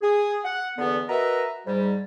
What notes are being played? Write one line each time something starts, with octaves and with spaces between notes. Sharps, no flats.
G#4
F#5
E2 D3 B3
F#4 A#4 B4 D#5 E5
G#2 G3